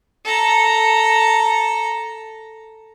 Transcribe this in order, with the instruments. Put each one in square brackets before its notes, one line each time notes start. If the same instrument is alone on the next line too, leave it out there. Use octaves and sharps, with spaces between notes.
[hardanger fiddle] A4 A#5